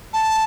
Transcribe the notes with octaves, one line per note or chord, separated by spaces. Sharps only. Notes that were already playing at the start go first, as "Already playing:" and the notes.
A5